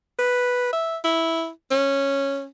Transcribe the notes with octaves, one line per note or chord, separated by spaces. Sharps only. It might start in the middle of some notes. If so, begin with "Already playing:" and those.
B4
E5
E4
C#4